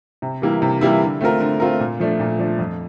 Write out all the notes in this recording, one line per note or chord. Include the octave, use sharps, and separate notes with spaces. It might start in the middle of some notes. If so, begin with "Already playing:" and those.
C3
E3 G3 A#3 E4
C3
E3 G3 A#3 E4
D3
A3 C4 F4 A#4
D3
A3 C4 F4 A#4
A#2
F3 A3 D4
A#2
F3 A3 D4
F2